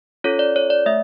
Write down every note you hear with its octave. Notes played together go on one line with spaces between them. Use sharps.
C#4 F4 A4 C#5
D5
C#5
D5
A3 E5